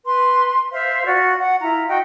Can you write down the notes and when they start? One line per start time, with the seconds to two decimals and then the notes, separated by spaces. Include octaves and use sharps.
0.05 B4 C6
0.72 C5 E5 F5
1.05 F4 F#4 D5
1.40 F#5
1.61 E4 F4 A#5
1.87 F#4 D#5 G5